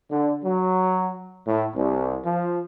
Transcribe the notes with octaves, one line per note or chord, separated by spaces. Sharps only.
D3
F#3
A2
C2
F3